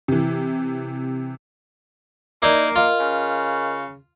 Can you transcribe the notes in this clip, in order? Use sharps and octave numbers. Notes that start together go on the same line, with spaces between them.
C3 E3
A#3 D#4 E4 A#4 D5
F4 A#4 D#5
C#3